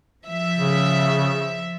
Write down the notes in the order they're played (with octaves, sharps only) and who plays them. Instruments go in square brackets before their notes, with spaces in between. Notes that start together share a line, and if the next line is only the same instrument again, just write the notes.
[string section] F3 E5
[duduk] C#3